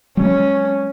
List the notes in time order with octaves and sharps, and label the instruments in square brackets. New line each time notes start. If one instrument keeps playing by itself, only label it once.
[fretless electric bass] F#3 G#3 [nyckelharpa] C#4